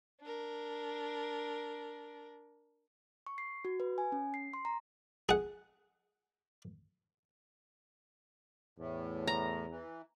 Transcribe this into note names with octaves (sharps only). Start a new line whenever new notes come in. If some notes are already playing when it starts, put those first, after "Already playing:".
D4 A#4
C#6
C7
F#4
B4
G#5
C#4
C7
C6
A#5
G#4 F#5
E2 A2
A#5
E3